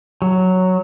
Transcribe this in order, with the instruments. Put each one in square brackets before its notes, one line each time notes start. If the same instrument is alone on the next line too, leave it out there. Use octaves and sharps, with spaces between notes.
[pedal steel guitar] F#3